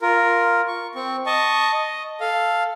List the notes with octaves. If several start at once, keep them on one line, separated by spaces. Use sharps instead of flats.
F4 A#4
C#6
C4 C#6
D#5 A5 C#6
D#5
A4 F5